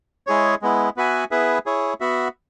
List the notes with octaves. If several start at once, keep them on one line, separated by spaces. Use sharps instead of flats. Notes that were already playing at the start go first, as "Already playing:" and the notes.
G#3 E4 G#4 C#5
G#3 B3 E4
B3 F#4 B4 E5 G#5
B3 E4 G#4 B4 E5
E4 G#4 C#5
B3 F#4 E5